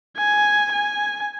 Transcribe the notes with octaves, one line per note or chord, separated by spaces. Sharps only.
G#5
G#5